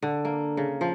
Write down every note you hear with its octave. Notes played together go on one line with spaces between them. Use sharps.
D3
A#3
C#3
F3